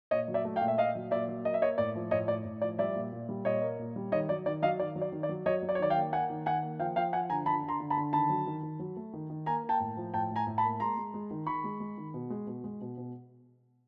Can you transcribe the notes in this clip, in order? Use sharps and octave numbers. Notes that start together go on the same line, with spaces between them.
A#2 C#5 D#5
F#3
D5 E5
A3
F5 G5
A#2
E5
A#2 D#5 F5
F#3
A#2 D5 E5
F#3
A#3 D#5
E5
A#3 C#5 D#5
A2 D5
F3
A2 C#5 D#5
A2 D5
A2
F3 D5
G3 D5 E5
A#2
A#2
G3
A#2 C#5 D#5
A#3
A#2
G3
D#3 C#5 D#5
F#3 D5
D#3 D5
F#3 D#5 F5
D#3 D5
F#3
D5
D#3
D5
F#3
F#3 C#5 D#5
F#3
D5
C#5
D#3 D5
F5 G5
A#3
A#3 F#5 G#5
D#3
D#3 F#5 G#5
A#3
F3 F5 G5
F3 F5 G5
F3 F#5 G#5
D3 G#5 A#5
D3 A5 B5
D3
A#5 C6
D3
A5 B5
D3
D#3 A5 B5
F#3
D#3
D#3
F#3
A3
D#3
D#3
A#3 G#5 A#5
A#3
G5 A5
A2
F3
A2 G5 A5
A2
G#5 A#5
A2
A5 B5
A#3
G#3 A#5 C6
G#3
G#3
D#3
D#3 B5 C#6
G#3
G#3
D#3
B2
G#3
B2
G#3
B2
B2